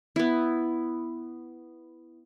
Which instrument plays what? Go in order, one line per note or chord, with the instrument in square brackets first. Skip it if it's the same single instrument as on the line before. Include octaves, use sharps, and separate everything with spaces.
[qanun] B3 E4